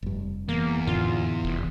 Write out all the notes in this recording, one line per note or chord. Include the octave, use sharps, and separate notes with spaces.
F1 G2
E2 A#3
F2 A2 D3 F4
F1